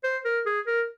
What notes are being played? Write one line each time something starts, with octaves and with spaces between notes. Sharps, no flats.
C5
A#4
G#4
A#4